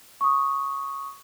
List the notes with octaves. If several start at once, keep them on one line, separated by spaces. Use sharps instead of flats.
C#6 D#6